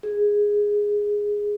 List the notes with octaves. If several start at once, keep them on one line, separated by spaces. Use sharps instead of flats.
G#4